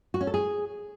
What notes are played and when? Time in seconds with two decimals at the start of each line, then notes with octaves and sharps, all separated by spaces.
0.14 F#4
0.21 C#4
0.27 A4
0.34 G#4